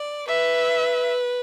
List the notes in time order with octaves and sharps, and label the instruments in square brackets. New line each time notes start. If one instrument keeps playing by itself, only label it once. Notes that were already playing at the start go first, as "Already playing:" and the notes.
Already playing: [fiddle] D5
[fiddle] B4 [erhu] E5